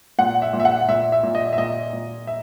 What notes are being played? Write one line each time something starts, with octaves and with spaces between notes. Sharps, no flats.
A#2 F#5
E5
A#2
E5
F#5
A#2 E5
E5
A#2
D#5
E5
A#2 D#5
A#2
E5